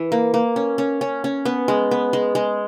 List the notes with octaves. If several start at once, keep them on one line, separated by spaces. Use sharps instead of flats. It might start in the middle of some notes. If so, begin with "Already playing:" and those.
Already playing: E3
A#3
A#3
C#4
C#4
C#4
C#4
B3
G#3
B3
G#3
G#3